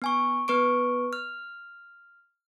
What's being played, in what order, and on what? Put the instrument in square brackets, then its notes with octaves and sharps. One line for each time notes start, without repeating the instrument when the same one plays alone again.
[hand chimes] B3 G#5 C#6
B3 B4 C#6 D7
F6